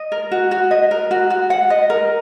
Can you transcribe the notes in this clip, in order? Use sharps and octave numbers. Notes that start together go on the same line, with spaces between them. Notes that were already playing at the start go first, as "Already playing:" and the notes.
Already playing: D#5
A#4
F#4
F#4
D#5
A#4
F#4
F#4
F#5
D#5
A#4